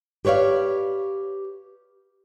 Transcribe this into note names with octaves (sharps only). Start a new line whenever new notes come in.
G4 B4 C#5 D5 F5